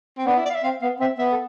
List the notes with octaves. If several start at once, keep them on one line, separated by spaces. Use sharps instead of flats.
C4
B3 D4
E4
D5
F5
E5
C4 F5
B3 F5
C4 E5
B3 E5
A4